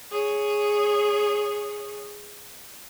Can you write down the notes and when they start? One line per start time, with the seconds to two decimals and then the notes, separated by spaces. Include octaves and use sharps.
0.11 G#4 C#5